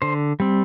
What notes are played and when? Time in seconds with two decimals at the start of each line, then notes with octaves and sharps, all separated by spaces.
0.02 D3 C5
0.40 G3 C4